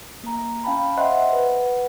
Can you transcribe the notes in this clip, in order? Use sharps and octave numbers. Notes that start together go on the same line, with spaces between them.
A#3 A#5
C#4 F5 G5 A5 B5
C5 D#5 E5 F#5 C6 F#6
B4 F#5